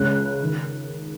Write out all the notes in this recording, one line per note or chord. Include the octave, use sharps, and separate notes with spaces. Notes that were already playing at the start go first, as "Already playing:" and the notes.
Already playing: C#2 C#3 G#3 C#4 F#6
D#3